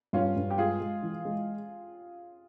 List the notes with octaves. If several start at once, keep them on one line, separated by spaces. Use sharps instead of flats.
G2 C#4 F4
G2
G4
G#3 F4 G#4
G#3
E3
G#3